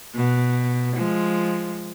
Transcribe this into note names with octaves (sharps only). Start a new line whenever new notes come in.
B2
F3 G#3